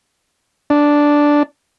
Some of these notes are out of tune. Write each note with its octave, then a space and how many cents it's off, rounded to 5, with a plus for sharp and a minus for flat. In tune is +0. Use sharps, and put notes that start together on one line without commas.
D4 -5